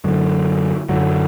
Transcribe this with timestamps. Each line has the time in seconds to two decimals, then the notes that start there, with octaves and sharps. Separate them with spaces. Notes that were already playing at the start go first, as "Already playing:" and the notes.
0.04 F#2 D3 F#3
0.89 F#2 D3 F#3